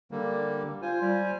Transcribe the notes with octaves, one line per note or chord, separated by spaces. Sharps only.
D3 G3 A#3
F4 C5 G#5
G3